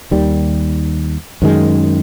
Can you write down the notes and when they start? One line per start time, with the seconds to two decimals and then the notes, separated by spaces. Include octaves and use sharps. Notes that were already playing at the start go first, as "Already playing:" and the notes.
0.11 D#2 D#3 G3
1.42 F#2 D#3 G#3